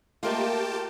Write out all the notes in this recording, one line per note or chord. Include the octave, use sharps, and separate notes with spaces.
A3 A#3 F4 G4 A#4 D#5 G5 A5